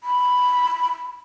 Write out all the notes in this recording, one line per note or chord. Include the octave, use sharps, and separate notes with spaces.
B5